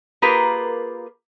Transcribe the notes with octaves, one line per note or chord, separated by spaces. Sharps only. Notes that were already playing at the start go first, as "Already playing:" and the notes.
A#3 F4 G4 G#4 A#4 B4